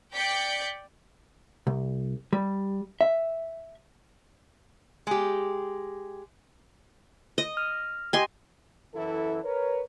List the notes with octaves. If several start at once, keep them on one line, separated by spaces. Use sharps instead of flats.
D5 G5 G6 B6 C#7 D7
C2
G3
E5
G#3 G4
D#5
F6
G4 D#5 G5 G#5 C6
F#2 E3 E4 A4
A#4 B4 C#5